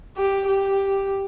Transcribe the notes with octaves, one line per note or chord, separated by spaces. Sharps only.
G4
G4